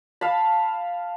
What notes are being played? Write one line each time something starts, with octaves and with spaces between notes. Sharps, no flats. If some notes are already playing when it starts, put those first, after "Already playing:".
F5 A5 B5